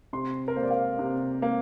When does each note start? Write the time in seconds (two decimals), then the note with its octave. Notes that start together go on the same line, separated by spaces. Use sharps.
0.13 C3 C6
0.48 A#4
0.56 A#3 C5
0.63 D5
0.70 F5
0.99 C3
1.42 A#3